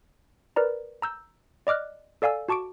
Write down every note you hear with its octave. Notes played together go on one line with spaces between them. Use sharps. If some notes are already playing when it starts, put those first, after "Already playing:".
A#4 B4 D5 A#5
A#5 E6 G6
D5 D#5 D6 F6 F#6
A4 D5 F5 G#5 E6
F#4 A5 C#6 D6 D7